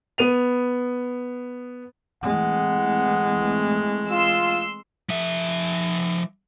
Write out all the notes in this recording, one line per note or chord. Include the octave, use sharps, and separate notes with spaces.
B3 D#7 F7
E3 G#3 A3 C4 F#5
F4 C6 E6
F3 E5